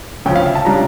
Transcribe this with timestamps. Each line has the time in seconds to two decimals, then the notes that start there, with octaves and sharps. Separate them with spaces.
0.25 D2 C#3 F3 C#4 G5
0.36 F5
0.46 E5
0.55 A5
0.65 C#3 G3 D4 A#5